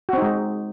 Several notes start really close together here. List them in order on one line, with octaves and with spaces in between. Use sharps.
F#4 C4 D#4 G#3